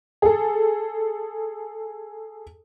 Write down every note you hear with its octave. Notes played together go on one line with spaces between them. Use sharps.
G#4 A4